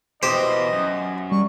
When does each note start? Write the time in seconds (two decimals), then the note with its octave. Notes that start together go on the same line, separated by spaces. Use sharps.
0.23 B2 E3 G4 C5 D#5
0.73 F#2
1.32 G3 C#6